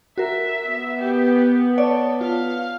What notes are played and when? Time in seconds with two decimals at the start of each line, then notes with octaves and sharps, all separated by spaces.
0.18 F#4 A#4 E5
0.66 B3
0.99 G4
1.78 A4 C#5 D5
2.21 F4 F5